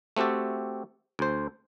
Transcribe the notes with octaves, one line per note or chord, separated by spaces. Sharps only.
A3 C4 F#4 G4 A4
D2 C5